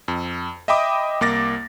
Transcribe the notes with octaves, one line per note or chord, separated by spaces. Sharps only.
F2
D#5 E5 G5 B5 D6 D#6
C2 A#3 D6 A6 A#6